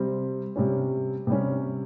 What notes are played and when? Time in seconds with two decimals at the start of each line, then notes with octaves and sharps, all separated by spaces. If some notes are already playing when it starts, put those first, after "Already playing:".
Already playing: C3 G3 C4
0.56 C3 G3 C#4
1.27 C3 G3 C#4